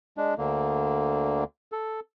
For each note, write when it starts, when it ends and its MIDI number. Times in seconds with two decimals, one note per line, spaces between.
0.17 0.34 56
0.17 0.34 62
0.38 1.44 38
0.38 1.44 50
0.38 1.44 58
1.72 2.00 69